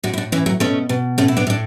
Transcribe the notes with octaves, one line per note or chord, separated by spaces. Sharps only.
A2 D4 F#4
E4
D4 F#4
E3 C#4 E4
F#3 A3
B2 A3 C#4
B2
A2 A3 C#4
E4
B3 D4
A2 D4